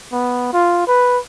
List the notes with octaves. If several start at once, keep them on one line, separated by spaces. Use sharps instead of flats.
B3
F4
B4